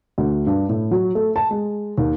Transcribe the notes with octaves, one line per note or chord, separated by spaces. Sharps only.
D2
G2
A2
F#3
A3
A5
G#3
D#2